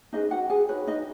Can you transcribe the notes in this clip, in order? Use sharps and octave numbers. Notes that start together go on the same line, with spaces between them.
C#4 D#4 G#4 B4 D#5
F#4 F#5
G#4 G#5
D#4 F#4 B4 C#5
D#4 D#5